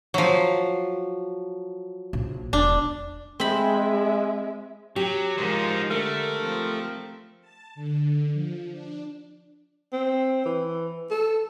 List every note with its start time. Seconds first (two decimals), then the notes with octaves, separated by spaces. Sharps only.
0.14 F3 F#3
2.13 A#1
2.53 E1 D4
3.40 G#3 C4 E5 B5
4.96 F#3 G4
5.38 F3 G#3 D#4 A#4 C5
5.91 D3 A3 A#4
6.41 F3 C4
7.41 A5
7.75 D3
8.33 F3
8.71 D4
9.93 C4
10.46 E3
11.11 A4